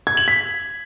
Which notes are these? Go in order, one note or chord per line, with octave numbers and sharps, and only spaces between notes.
G#6
F#7
B6